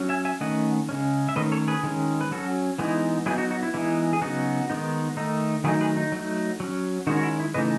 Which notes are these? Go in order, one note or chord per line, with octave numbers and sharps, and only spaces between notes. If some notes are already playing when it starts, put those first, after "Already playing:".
Already playing: F#3 C#4
E5 G#5
E5 G#5
D#3 A3 C#4 D#5 F#5
C#3 G#3 C#4
E5
D#3 A3 C#4 B4 D#5
A4 C#5
G#4 B4
D#3 G#3 C#4
B4
F#3 C#4 F#4 A4
E3 G#3 B3 D#4 E4 G#4
F#3 B3 D#4 E4 G#4
D#4 F#4
D#4 F#4
E4
E3 G#3 B3 D#4 E4
G#4
C#3 F#3 B3 D#4 F#4
D#3 G#3 B3 D#4
D#3 A3 D#4
D#3 F#3 A3 D#4 E4 G#4
G#4 B4
D#4
F#3 A3 D#4
F#3 C#4
D#3 G#3 C#4 D#4 F#4
F#4
E4
E4
C#3 E3 A3 D#4 B4 D#5